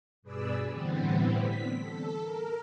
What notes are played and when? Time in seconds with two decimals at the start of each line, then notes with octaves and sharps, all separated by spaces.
0.22 G2 B2 G#4 B4 D5 E6
0.72 A2 D3 E3 G3 B3 C4
1.35 B6
1.79 A4
2.20 A#4